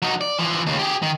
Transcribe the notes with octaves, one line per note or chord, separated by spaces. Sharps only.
F#3 D#4
D5
E3 F3
D#2 C#3
G4 G#4
D#3